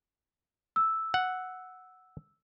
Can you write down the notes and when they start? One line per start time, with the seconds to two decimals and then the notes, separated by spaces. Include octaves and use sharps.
0.76 E6
1.14 F#5